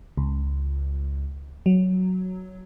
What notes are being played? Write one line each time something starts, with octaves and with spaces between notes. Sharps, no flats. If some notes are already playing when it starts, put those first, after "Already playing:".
C#2
F#3